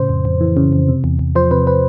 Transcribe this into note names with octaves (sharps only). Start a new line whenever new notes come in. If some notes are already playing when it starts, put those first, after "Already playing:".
Already playing: A2 C#3 C5
F2
F2
E3
C#3
F2
C3
E2
E2
F3 C5
C3 B4
B4